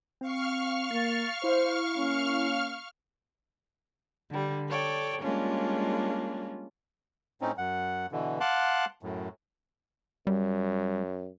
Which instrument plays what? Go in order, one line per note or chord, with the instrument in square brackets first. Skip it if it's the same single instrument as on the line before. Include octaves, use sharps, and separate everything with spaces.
[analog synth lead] C4 [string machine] F5 C#6 F6
[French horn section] A#3 [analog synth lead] A6
[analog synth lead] E4 [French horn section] C5
[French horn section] A#3 C#4
[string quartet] D3 G3
A4 C#5 D5 G5
G3 G#3 A#3 C#4 D4 F4
[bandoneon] A2 C4 C#4 D#4
F#2 F#5
B2 D3 E3
F5 F#5 A5 C6 D6 F#6
F#2 A2
[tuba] F#2 [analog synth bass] G3